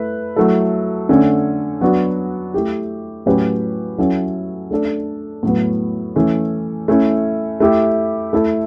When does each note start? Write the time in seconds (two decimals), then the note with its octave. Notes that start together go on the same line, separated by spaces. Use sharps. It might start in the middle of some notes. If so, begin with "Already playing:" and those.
Already playing: A3 E4 B4
0.36 F#3 A3 E4 A4
1.09 D3 A3 C#4
1.81 F#3 B3 D4 F#4
2.54 A3 E4 G4
3.26 A2 F#3 C#4 G4 B4
3.98 F#3 C#4 E4 A4
4.71 A3 D4 A4
5.43 A2 F#3 B3
6.16 E3 A3 C#4
6.88 A3 C#4 E4
7.60 A3 E4 G4
8.33 A3 E4 A4